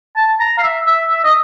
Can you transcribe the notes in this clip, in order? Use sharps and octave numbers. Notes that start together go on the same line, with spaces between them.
A5
A#5
F5
E5
E5
E5
D#5